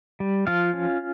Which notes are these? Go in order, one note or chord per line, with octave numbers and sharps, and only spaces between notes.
G3
F3 F4 F5
C#4